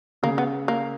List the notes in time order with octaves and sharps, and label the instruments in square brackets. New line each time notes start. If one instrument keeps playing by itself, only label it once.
[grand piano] C#3 [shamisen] A#3
[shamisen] B3
A#3